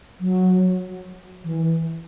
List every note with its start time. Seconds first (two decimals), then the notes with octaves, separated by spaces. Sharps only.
0.20 F#3
1.44 E3